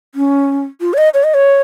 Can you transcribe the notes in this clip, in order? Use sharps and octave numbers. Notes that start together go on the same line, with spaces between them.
C#4
F4
C#5
D#5
C#5
D#5
C#5